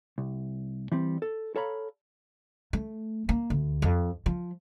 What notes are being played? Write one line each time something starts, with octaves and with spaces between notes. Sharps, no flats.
C2
E3 G3 C4
A4
A4 C#5 F5 A#5 B5
A3
A#3
D2
F2
F3